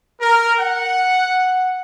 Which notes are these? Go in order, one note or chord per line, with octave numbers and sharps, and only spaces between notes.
A#4
F#5